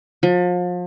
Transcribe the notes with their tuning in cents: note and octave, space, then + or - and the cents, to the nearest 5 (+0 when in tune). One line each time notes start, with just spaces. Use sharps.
F3 +35